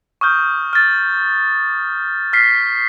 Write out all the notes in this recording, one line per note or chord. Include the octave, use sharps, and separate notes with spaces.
C#6 D#6 F6 G6
F6 A6
F6 B6 C7